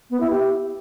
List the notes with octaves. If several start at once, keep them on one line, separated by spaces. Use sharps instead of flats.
B3
E4
G4